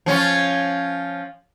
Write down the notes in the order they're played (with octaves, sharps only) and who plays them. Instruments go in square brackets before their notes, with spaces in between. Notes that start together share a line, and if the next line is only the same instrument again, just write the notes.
[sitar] F3 C#4 F4